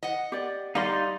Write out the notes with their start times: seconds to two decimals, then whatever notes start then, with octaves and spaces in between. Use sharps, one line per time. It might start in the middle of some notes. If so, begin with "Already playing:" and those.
0.03 D#5 F#5
0.32 G4 D5
0.75 G3 D#4 G4 D5 D#5 F5 C6